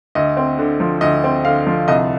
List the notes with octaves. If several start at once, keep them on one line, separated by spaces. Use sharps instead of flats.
D2 D#5
C4
D3
F3
D2 D#5
C4
D3 F5
F3
C2 D#5